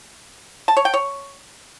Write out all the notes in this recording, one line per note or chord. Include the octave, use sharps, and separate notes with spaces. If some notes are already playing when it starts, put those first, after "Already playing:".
A5
C#5
G5
C#5